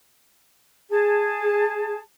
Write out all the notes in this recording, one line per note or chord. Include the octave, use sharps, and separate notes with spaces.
G#4 A5